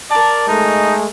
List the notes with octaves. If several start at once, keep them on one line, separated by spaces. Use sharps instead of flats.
A#4 D5 A5
G#3 A3 D#4